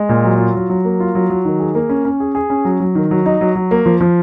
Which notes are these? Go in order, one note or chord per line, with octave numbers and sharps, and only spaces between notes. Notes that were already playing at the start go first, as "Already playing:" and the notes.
Already playing: G#3
A#2
F#3
F4
F#3
F#3
A#3
F4
F#3
F#3
D#3
G#4
A#3
C#4
C#4
G#4
G#4
C#4
F#3
F#3
D#3
F#3
D#4
F#3
F#3
A#3
F3
F3